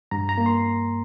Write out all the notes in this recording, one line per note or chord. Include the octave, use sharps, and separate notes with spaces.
G2 A#5
A#5
A#3
C6